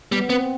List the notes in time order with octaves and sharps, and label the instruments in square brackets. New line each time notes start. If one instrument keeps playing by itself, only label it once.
[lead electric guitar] G3 [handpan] B3
[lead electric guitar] B3 [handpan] C4